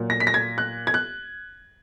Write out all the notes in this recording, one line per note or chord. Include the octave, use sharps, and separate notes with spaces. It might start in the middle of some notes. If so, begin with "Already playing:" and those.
Already playing: A#2 F#3
A#6
B6
A#6
G#6
F#6
G#6
F#6